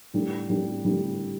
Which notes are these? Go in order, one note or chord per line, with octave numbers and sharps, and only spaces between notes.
A2 G3 D4 G4
A2 G3 D4 G4
A2 G3 D4 G4